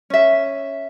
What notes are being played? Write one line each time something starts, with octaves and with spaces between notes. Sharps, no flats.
C#4 E5